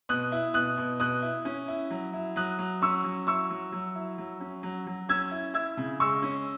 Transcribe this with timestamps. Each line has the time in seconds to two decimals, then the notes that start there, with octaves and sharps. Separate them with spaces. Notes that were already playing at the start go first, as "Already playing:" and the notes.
0.09 B2 D#6 F#6
0.32 E4
0.54 B2 D#6 F#6
0.77 B2
1.00 B2 D#6 F#6
1.22 E4
1.45 C#4
1.68 E4
1.90 F#3
2.13 E4
2.36 F#3 D#6 F#6
2.59 F#3
2.82 C#4 C#6 E6
3.04 F#3
3.27 E4 C#6 E6
3.50 F#3
3.72 F#3
3.95 E4
4.18 F#3
4.40 C#4
4.63 F#3
4.87 F#3
5.09 C#4 E6 G#6
5.31 E4
5.54 E4 E6 G#6
5.77 C#3
6.00 G#3 C#6 E6
6.22 C#4